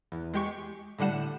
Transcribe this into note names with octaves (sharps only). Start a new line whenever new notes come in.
E2
G#3 G4 C#6
A2 D3 G3 F#5 E7